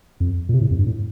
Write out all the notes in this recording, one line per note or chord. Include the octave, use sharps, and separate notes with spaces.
F2
A#2
C3
A2
F2
G2
A2